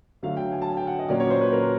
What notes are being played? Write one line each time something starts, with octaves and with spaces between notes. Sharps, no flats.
D3 F#3 A3 F5
G5
G#5
A5
G#5
G5
F#5
D#5
A#2 F#3 A#3 C#4 D5
C#5
C5
B4
A#4